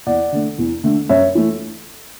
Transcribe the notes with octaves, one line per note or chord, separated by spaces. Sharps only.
E2 D5 F#5
D3 A3
E2
D3 A3
F#2 C#5 E5
E3 A3